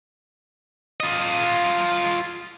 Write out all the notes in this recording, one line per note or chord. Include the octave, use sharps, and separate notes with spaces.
F4 D#5